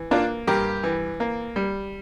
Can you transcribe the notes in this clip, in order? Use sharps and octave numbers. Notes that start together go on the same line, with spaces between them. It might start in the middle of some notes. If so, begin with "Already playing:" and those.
Already playing: E3
A#3 D4 F4
G2 G4 A#4
E3
A#3
G3